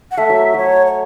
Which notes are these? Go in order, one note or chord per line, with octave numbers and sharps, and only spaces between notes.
F#5
A3 E5
F#3
F#3 C#5
C#5